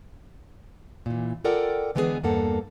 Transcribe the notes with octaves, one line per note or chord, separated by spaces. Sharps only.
A#2 E3
F4 A4 A#4 D5 F#5 G5
D3 E3 G#3 B3 F#4 G#4
E2 G2 A#3 A4 F#5